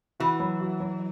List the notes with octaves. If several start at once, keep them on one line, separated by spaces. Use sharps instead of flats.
E3 F#4
F#3
F#4
F#3